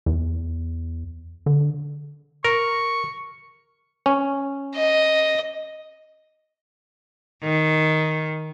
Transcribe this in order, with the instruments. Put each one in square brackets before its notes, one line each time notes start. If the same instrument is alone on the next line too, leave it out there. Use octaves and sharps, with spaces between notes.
[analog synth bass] E2
D3
[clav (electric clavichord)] A#4 [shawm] C#6
[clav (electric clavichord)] C#4
[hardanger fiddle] D#5
[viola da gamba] D#3